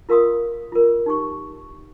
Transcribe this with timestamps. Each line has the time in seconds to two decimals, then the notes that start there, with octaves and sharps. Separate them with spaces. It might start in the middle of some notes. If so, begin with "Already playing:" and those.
0.09 F4 A#4 F5 C6 D#6
0.72 F4 A#4
1.06 D#4 G4 C#6